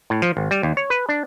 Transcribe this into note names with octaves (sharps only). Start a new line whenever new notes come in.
A2
F3
G#1
G3
D#2
C#5
B4
D4